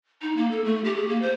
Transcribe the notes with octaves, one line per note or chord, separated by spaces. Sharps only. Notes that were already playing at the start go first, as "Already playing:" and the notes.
D#4
A#3
A4
A3
G4
G#4
A#3
C5